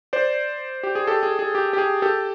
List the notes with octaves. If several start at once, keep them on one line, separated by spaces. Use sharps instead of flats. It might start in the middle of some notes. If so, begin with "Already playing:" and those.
C5 D5
G4
G#4
G4 A4
G#4
G#4
G4
G4
G#4
G4 A4